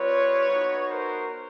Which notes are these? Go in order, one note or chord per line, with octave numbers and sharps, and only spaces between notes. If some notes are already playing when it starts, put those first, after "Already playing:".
Already playing: G3 C4 F4 B4 C#5
B3 D#4 F#4
A#4 C5